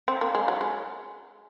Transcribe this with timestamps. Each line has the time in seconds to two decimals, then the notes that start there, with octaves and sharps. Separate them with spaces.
0.08 C4
0.21 A#3
0.35 G#3
0.48 F#3
0.61 G#3